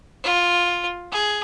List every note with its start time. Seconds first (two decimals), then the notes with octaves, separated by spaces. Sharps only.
0.23 F4
1.12 G#4